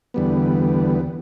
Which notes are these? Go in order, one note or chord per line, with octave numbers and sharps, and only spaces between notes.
E2 D3 G3 B3